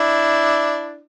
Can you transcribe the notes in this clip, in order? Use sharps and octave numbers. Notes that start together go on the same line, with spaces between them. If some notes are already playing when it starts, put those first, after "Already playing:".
Already playing: D4 E4